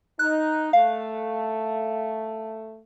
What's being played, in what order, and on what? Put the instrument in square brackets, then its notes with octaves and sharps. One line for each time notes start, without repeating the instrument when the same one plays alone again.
[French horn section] D#4 [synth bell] F#6
[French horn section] A3 [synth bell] F5